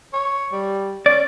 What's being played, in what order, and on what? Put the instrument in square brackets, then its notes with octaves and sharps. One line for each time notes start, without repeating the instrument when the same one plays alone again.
[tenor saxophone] C#5
G3
[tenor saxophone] C#4 [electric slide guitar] D5